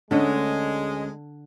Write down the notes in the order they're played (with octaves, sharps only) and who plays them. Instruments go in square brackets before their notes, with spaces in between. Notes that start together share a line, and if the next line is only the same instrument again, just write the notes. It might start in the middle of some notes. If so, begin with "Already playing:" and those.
[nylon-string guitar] D2 C#4 [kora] D3 [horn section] G#3